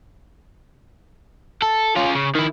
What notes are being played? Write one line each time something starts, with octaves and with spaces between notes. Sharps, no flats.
A4
C#4 F4
C#3
D#3 E4